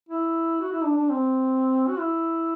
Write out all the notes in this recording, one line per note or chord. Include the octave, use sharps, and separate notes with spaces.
E4
F#4
E4
D4
D4
C4
F#4
E4